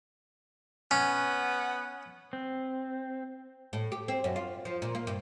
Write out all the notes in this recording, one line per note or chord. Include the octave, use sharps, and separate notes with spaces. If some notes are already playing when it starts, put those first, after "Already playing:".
B3 C#4
C4
A2
G4
C4
F#2
F4
F3
A#2
A#3
G2